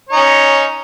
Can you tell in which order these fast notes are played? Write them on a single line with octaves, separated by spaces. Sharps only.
C#5 D#4 C#4